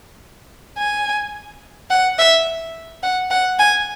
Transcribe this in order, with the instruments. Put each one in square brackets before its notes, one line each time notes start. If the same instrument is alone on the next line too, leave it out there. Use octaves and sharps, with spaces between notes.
[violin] G#5
F#5
E5
F#5
F#5
G#5